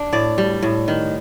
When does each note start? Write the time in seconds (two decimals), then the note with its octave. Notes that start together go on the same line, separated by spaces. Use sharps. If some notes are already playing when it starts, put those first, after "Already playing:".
Already playing: D4
0.13 A2 D5
0.38 G3
0.62 A2
0.88 D#3